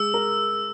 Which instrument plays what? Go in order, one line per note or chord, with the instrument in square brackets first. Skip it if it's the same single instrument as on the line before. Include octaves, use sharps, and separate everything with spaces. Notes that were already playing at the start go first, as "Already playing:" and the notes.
Already playing: [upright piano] G#3 [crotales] E6
[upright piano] A#4